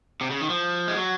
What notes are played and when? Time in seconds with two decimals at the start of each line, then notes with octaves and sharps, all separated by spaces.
0.21 C3
0.30 C#3
0.41 D#3
0.50 F3
0.88 G#3
0.96 F#3